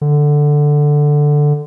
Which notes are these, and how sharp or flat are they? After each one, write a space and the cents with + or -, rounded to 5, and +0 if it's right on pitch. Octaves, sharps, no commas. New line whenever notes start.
D3 +5